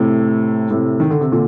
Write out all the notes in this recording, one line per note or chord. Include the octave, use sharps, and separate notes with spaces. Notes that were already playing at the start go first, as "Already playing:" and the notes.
Already playing: A2 C3
A2 C3
D#3
D3
C3
A#2 D3